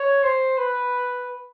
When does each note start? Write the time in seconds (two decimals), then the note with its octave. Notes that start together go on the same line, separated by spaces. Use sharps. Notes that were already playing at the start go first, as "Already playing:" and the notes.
Already playing: C#5
0.23 C5
0.58 B4